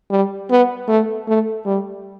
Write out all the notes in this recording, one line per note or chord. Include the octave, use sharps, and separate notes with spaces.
G3
B3
A3
A3
G3